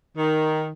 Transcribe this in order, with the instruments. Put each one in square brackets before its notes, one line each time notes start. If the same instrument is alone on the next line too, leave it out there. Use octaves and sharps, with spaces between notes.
[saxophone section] D#3